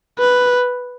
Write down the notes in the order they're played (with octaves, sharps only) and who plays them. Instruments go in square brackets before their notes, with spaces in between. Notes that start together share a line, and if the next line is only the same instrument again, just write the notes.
[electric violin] B4